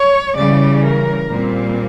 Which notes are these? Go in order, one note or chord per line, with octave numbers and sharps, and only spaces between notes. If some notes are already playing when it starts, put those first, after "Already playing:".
Already playing: C#5
C#3 E3 G3 D5
A#4
A#2 G3 C4